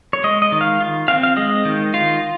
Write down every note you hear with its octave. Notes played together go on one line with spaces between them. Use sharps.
C#5
G#3 D#5
D#5
D#3
F5
F4
C4 F5
F5
G#3 D#5
D#3
F4